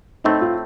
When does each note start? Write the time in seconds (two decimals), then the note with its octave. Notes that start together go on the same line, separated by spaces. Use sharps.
0.24 A2 A3 C4 D#4
0.41 F4